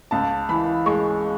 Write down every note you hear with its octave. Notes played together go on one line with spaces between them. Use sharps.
C#2 A5
E3 B5
G#3 C#6